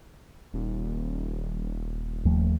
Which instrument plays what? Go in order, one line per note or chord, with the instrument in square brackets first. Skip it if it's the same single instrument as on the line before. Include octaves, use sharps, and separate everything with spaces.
[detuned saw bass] D#1
[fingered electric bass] D#2 F3 A3